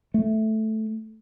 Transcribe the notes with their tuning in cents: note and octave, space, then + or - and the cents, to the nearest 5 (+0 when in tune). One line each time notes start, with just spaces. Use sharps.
A3 -5